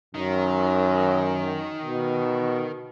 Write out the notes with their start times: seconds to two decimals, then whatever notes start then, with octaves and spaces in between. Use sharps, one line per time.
0.15 F#2 D#3
1.82 B2